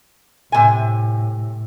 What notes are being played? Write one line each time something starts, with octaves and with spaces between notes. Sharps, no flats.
A2 C3 G#5